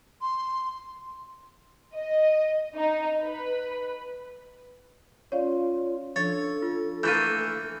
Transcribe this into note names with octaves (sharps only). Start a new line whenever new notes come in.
C6
D#5
D#4
B4
C#4 F4 C#5 D5 F5
F3 D4 A4 C#5 A6
F4
E3 A3 A#3 G6 D#7